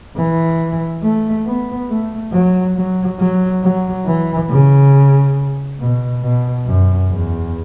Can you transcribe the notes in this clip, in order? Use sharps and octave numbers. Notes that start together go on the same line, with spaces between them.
E3
A3
B3
A3
F#3
F#3
F#3
F#3
E3
C#3
B2
B2
F#2
E2